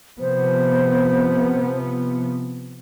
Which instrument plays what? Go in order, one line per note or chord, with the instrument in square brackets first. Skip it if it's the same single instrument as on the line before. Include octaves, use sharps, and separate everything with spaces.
[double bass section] C3 F3 B3 [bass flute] C5